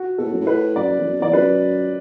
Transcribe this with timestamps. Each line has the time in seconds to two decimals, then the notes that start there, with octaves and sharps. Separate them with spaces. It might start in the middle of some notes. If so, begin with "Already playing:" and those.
Already playing: F#4
0.18 B2 A4
0.25 A2
0.32 F#2
0.40 A2
0.47 B4
0.75 F#2 D5
0.98 E2
1.04 F#2
1.19 E2 D5
1.33 F#2 B4